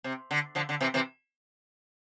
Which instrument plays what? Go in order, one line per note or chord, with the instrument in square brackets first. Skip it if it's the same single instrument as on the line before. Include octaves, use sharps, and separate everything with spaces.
[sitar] C3
D3
D3 F3
D3
C3 E3
C3 E3